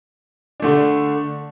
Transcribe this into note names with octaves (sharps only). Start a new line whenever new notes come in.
D3 A3 D4